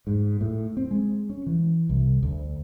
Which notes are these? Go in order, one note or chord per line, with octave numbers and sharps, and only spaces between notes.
G#2
A2
C4
G#3
C#4
E3
C2
D2